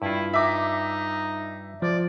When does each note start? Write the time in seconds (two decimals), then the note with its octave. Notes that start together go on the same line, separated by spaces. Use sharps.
0.02 G2 E4 F4
0.33 D#4 E5 D6
1.82 F3 D5